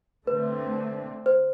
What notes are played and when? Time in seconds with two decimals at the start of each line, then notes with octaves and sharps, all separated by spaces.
0.27 D3 A3 C4 B4
1.26 C5